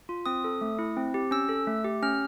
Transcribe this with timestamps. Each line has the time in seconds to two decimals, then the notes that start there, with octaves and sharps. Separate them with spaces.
0.09 F4
0.26 C4 D#6
0.44 A4
0.61 A3
0.79 E4
0.97 C4
1.14 G4
1.31 C#4 E6
1.49 A4
1.67 A3
1.85 G4
2.03 C#4 F6